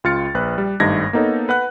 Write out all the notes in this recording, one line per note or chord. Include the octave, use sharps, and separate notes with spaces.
C#2 F4 F6 A6 C#7
A#1 B4 F#6
G3
G#1 G2 A3 D#4 G#6 A#6
A#3 B3 D#4 A4 C#5
B4 F#5 F#6